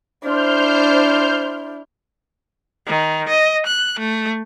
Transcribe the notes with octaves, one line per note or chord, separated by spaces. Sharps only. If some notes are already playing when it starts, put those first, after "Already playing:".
D4 E4 C5 F6 G6
D#3
D#5
F#6
A3